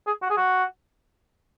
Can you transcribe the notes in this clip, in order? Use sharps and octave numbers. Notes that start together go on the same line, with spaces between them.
G#4
F#4
G#4
F#4